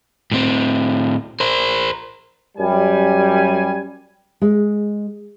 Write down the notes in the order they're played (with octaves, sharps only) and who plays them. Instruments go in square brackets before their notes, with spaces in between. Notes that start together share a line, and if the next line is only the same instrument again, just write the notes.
[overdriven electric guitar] A2 C4
A#4 C5
[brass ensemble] F#2 G3 G#5
[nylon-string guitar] G#3